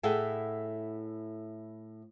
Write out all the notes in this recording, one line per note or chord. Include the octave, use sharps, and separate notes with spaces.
A2 E4 G#4 A4 F#5 G5